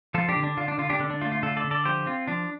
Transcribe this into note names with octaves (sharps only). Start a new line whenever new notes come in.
F3 F4 A4
D4 G4
D3
D4
D3 F4
D4
D3 F4
D4 G4
D3 D4
D4
A3 F4
F4
D3 F4 A4
A4 D5
D3
A4 D5
F3 G4 C5
C4 F4
F3 D4